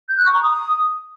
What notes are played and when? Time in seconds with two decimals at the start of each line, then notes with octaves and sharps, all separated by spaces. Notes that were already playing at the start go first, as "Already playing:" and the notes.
0.09 G6
0.17 F#6
0.26 C#6
0.34 A#5
0.43 D#6